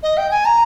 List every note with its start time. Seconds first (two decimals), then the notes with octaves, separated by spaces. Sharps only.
0.03 D#5
0.17 G5
0.31 G#5
0.45 A#5